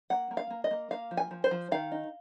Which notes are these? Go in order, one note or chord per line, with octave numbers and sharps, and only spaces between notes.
A#3 F#5
A#3
F5
A#3
D#5
A#3
A#3 F5
F3
G#5
F3
C5
F3
D#3 F5
D#4